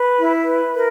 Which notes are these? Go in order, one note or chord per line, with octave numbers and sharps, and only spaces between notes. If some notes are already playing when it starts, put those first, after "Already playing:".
Already playing: B4
E4
B4
A#4